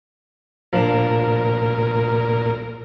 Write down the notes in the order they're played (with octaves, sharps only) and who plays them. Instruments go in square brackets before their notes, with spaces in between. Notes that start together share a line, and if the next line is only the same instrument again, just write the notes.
[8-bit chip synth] A#2 A#4 [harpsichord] F3 D4